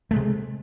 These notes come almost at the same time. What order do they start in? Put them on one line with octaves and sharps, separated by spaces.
A3 G#3 C3